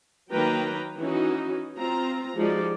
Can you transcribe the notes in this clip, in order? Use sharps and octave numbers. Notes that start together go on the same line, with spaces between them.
D#3 F#3 A#3 B4 G5 A#5
E3 C#4 D#4 F#4
C4 F4 A#5
F3 G#3 D#4 F#4 G4 D5